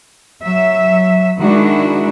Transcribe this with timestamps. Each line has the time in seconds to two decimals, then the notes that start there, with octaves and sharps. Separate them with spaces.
0.42 F#3 E5
1.39 D#3 G#3 D4 E4 F#4